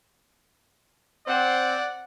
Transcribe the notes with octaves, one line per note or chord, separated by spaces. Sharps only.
C4 D5 F#5